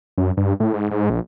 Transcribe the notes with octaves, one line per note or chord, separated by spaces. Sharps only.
F#2
G2
A2
G#2
G#2
A#1